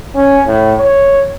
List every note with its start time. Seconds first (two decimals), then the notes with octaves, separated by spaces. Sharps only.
0.15 C#4
0.47 A2
0.79 C#5